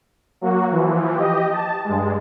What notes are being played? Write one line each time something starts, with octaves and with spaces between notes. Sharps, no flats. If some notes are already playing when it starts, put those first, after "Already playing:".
F#3 A#3 F#4
E3 F3
G4 D#5
A5
G2 G#3